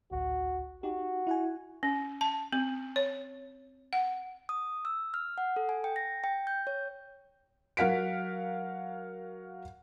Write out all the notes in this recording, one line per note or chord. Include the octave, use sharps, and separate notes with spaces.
A1 D2 F#4
D#4 F#4 G4
E4 F#5 G#5
C#4
A5
C4
C#5
F#5
D#6
E6
F6
F#5
A4
G#5
G5
A#6
G5
G6
C#5
F#3 A#4 F5 F#5 B6 D7